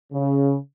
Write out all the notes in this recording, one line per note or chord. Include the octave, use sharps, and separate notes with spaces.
C#3